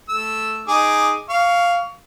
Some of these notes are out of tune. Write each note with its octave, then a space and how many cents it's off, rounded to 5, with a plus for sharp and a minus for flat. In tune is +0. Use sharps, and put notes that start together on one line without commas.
A3 -5 E6 +0
D#4 +0 G#4 +0 D6 +5
F5 +0 C#6 +25